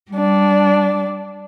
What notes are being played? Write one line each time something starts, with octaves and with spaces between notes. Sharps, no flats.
G3 D4